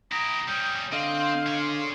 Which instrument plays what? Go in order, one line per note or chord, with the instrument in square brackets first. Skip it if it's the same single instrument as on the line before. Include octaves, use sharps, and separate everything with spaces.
[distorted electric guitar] E4 G4 [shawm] A#5 [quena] D#6
[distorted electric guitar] G3 C#4 [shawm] G5
[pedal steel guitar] D3 D#5 [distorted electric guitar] C4 [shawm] F5 [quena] C6
[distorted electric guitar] G#4 C#5